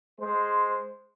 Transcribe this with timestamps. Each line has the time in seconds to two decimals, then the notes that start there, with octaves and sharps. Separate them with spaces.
0.19 G#3 C5